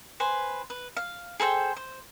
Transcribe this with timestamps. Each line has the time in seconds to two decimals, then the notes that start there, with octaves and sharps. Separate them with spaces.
0.20 B4 C5 G#5
0.70 B4
0.97 F5
1.40 G#4 A4 C5 G5
1.76 C5